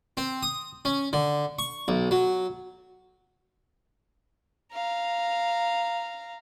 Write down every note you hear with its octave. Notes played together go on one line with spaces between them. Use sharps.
C4
D#6
C#4
D3
C#6
B1
F#3
F5 A#5